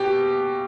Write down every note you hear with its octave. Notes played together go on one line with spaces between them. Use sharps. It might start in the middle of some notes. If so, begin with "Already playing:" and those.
Already playing: B2 G4